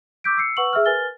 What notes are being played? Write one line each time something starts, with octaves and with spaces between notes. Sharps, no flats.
C#6 D6 E6 G6 B6 D7
E6 C7 C#7
B4 F#5 C#6 E6 F#7
G#4 E5 E6 F6
A#4 B4 G#5 F6 A6 G7